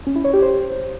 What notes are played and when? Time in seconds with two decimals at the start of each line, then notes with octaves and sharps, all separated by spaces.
0.07 C#4
0.16 E4
0.24 C#5
0.33 G4
0.42 C5